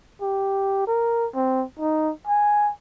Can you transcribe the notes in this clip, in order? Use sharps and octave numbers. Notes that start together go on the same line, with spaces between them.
G4
A#4
C4
D#4
G#5